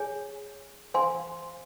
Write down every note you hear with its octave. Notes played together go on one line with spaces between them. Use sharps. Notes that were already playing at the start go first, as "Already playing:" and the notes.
Already playing: G#4 C#5 G#5
C5 F5 G#5 C6